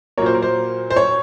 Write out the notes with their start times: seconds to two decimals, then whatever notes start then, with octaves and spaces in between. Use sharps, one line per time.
0.18 A#2 F#3 A#3 C#5
0.26 C5
0.35 A#4
0.42 C5
0.90 C5
0.96 C#5